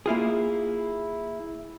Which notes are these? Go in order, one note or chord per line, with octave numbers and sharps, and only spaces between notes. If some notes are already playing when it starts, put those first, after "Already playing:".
A#3 E4 F4 G#4